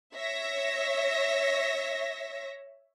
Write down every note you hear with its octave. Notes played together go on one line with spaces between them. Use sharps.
C#5 E5 A#6